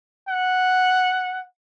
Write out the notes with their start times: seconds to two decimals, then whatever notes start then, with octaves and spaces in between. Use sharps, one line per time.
0.29 F#5